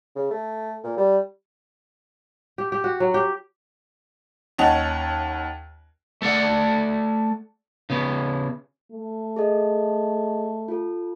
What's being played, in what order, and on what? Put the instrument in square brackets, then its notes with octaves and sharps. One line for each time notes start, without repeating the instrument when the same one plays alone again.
[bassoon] C#3
A3
A#2
G3
[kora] G4
G4
F#4
F#3
G4
[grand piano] D#2 C#4 D#5 F#5 A5 F7
[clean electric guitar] A3 A4 D5 F#5
C#3 B3
[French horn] A3
[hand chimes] G#4 A4 D#5
F4 A4